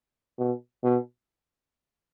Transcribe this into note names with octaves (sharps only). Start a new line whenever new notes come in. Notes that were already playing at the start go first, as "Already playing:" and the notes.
B2
B2